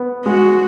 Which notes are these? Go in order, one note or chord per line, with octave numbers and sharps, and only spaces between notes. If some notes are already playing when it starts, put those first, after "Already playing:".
Already playing: B3
G#3 F#4